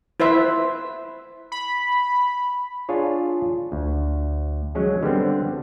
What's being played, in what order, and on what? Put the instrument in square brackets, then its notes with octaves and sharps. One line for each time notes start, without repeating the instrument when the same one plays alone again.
[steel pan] E4 B4 C5 E5
[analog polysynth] B5
[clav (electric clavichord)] D4 F4 G#4 C#5
D2
F#3 G#3 C#4 G#4
D3 G3 B3 C4